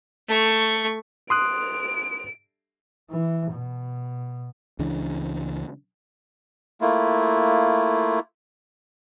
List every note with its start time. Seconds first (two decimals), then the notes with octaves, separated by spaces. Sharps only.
0.29 A3 C#6
1.30 C6 D#6 F#6 D7
3.10 E3
3.52 B2
4.79 C#2 C#3 E3 D4
6.81 A3 A#3 E4 F4